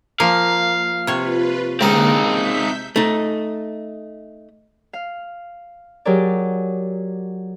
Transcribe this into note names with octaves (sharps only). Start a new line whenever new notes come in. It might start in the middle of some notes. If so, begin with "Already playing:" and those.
F3 A#3 F5
C3 F4 B4 C#5
C#2 D3 A#3 C4 D#4 A#4
E5 G6 B6
A3 D#4
F5
F#3 G4 G#4 A#4 D5